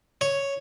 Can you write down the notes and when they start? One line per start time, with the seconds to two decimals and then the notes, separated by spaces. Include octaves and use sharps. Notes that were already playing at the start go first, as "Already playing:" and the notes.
0.21 C#5